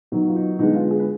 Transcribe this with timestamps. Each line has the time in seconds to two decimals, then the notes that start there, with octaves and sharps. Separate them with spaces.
0.12 D#3 F#3 B3 D#4
0.28 F4
0.36 D#4
0.59 D3 G#3 B3 D#4
0.74 F4
0.91 G#4
1.00 B4